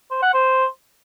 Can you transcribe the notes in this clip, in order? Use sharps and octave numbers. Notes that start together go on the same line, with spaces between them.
C5
F#5
C5